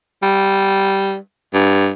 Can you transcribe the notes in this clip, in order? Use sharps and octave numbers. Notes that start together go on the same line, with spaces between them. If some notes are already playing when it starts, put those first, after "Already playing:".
G3
G2